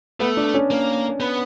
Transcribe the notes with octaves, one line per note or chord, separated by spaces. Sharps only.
A3 B3
D4
C#4
A#3
B3